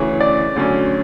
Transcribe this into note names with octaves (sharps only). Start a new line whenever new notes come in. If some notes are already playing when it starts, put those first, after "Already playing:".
Already playing: D2 C#3 E3 C#5
D5
D2 D3 F#3 C#4